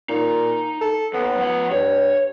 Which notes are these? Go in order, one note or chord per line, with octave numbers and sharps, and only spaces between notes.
A#2 D#4
A4
D#2 B3
F3 F#5
G2 C#5